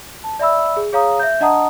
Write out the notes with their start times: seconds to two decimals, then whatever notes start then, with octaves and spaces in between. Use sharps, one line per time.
0.24 A5
0.39 D5 E5 B5 E6
0.77 G#4
0.93 G#4 C#5 F5 A#5 D#6
1.20 E5 G6
1.40 D4 D#5 F#5 A5 A#5 D#6